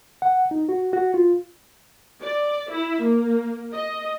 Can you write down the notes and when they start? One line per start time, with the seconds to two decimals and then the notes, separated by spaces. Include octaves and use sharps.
0.22 F#5
0.51 D#4
0.69 F#4
0.93 F#4
1.14 F4
2.21 D5
2.70 E4
3.01 A#3
3.73 D#5